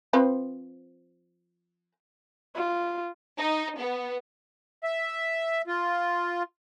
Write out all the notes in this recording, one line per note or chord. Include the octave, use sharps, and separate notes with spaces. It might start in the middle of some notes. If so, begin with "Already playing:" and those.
F3 C4 B4
F4
D#4
B3
E5
F4